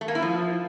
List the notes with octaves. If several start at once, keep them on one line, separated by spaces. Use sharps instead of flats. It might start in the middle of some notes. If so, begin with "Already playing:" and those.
A3
A#3
E4
F3